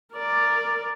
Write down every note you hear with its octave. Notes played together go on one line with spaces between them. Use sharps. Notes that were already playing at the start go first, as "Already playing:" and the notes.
A#4 D5